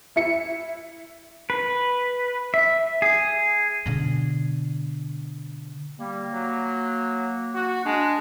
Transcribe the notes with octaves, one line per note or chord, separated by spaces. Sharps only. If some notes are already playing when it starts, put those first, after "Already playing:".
E4 E5 C#7
B4
E5
G#4
B2 D3
G3 A#3
F#3
F#4
G#3 D4